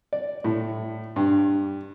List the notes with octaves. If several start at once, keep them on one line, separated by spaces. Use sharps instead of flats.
D5
A2
G2